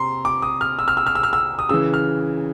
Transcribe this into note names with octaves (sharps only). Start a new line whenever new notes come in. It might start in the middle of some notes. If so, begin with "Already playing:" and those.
Already playing: C3 A#5 C6
D6
D#6
F6
E6
F6
E6
F6
E6
F6
E6
D#6
C#3 E3 E6
F6